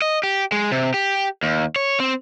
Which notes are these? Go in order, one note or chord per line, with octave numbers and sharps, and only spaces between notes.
D#5
G4
G#3
C3
G4
D#2
C#5
C4